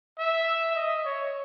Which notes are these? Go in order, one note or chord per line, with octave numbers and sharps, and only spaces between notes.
E5
D#5
C#5